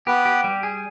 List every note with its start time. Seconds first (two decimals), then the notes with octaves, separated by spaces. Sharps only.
0.07 B3 G4 B4
0.25 G4
0.44 G3
0.63 G#4